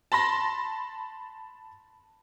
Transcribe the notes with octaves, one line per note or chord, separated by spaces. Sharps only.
A5 B5 C6 A#6